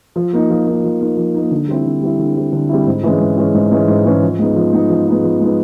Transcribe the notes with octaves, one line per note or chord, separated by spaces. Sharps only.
F3
A#3 D#4
F3
A#3 D#4
F3
A#3 D#4
F3
A#3 D#4
D3
G3 C4 E4
D3
G3 C4 E4
D3
G3 C4 E4
D3
G3 C4 E4
G#2
E3 G#3 C#4
G#2
E3 G#3 C#4
G#2
E3 G#3 C#4
G#2
E3 G#3 C#4
F3
G#3 B3 D#4
F3
G#3 B3 D#4
F3
G#3 B3 D#4
F3
G#3 B3 D#4